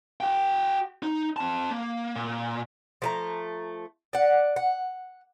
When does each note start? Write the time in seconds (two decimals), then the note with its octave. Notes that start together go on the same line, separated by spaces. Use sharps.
0.20 F#4 G5
1.03 D#4
1.36 C4 A5
1.71 A#3
2.15 A#2
3.02 F3 A3 A#5
4.13 D5 F#5
4.56 F#5